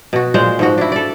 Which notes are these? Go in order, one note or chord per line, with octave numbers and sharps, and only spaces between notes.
B2 F#4
A#2 G#3 C5
G#2 F3 F#4
D4 E4
A4 D5